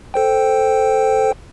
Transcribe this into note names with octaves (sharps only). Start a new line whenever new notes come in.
A4 C5 G5